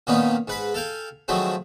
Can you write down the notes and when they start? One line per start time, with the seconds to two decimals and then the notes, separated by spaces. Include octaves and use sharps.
0.07 A#2 D#3 A#3 B3 C#4 D#4
0.48 G#2 B4 B5
0.74 A4 F5 G5 G#5
1.28 D#3 F3 F#3 G#3 A3 C4